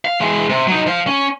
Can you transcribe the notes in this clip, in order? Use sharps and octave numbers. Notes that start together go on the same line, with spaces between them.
F5
E3 G#3
C3
F#3 D#4
F3 F5
C#4